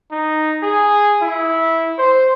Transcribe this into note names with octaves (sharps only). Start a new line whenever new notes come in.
D#4
G#4
E4
C5